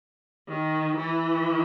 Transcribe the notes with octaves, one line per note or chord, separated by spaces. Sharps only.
D#3
E3